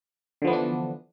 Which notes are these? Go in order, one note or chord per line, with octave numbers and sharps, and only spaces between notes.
D3 E3 F3 B3 D4